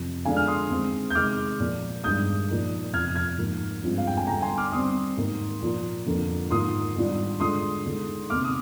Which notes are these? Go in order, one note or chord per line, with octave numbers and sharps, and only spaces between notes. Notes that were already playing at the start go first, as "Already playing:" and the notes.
Already playing: F2 C3 F3
D3 F3 G#3 D4 F5 G#5
F6
C6 D#6
D#3 G#3 C4
G6
C3 D#3 G#3 D6 F6
A#2 F3 A#3
G2 D#3 G#3 D#6 G6
A#2 F3 A#3 D#4
F2 C3 F3 F6 G#6
F6 G#6
G#2 F3 A#3
G2 F3 G#3 C4 F4
F5
G5
G#5
D3 G3 D4 G5 A#5
G#5 C6
D6 F6
D#3 G3 C4 C6 D#6
G#2 D#3 A#3
A#2 F3 A#3 F4
F2 D3 F3 A#3 F4
G#2 D#3 A#3 F4 C6 D#6
G#2 D#3 G3 D4 F4
D3 G#3 D4 F4 C6 D#6
D3 G#3 D#4
C3 D#3 A#3 D#4 D6 F6
D#6